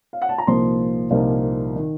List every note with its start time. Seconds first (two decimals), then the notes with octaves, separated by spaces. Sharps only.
0.13 F5
0.22 F#5
0.29 A5
0.38 A#5
0.47 C2 A#2 F3 A#3 D#4 C6
1.11 C2 A#2 F3 A#3 D#4
1.76 D#3